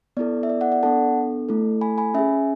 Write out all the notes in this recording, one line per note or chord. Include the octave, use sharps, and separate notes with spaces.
B3 E4 A4 D5
E5
D5
D5 F#5
D5 F#5
B3 D4 A4 F#5 A5
A3 E4 A4
G#5 B5
G#5 B5
C#4 G#4 E5 G#5